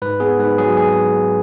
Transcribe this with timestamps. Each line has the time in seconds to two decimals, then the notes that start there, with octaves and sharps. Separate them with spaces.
0.02 G#2 B4
0.20 B3 G#4
0.39 G#2 B4
0.58 F#3 G#4
0.77 G#4